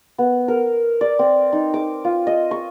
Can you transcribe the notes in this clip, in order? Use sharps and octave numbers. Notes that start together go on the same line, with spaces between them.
B3
A#4
D5
C4
D#4
D6
F4
D#5
C#6